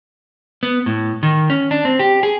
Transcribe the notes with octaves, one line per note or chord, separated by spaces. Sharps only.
B3
A2
D#3
C#4
D4
C4
G4
G#4